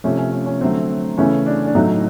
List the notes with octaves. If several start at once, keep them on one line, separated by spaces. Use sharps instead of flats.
C3 F3 A3 C#4
C#4
C#4
C#4
D3 F#3 A3 C4
C#3 E3 A3 C#4
D4
D4
A2 F#3 A3 D#4